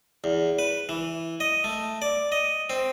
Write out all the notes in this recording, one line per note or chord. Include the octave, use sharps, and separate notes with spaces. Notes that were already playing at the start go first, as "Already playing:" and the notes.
E2
B4
E3
D#5
A3
D5
D#5
C4